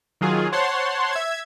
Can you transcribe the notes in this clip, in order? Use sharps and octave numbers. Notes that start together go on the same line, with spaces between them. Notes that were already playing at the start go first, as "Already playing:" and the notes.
D#3 F#3 F4 G#4
C5 C#5 F#5 A5 C6
E5 G#6